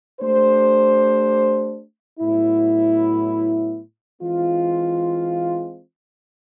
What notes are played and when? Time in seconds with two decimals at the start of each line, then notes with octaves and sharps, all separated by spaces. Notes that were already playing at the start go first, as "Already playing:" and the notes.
0.20 A3 D4 G4 C5
2.20 A2 F#3 B3 E4
4.21 E3 G#3 C4 F4